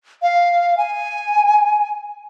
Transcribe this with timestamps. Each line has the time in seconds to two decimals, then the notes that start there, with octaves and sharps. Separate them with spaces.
0.22 F5
0.77 G#5